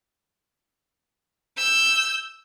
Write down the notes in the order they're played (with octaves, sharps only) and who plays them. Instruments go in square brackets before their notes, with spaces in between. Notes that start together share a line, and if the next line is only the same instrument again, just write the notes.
[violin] E6 G6